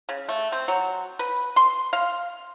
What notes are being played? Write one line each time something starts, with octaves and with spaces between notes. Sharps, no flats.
C#3
A3
C4
F#3
B4
C6
F5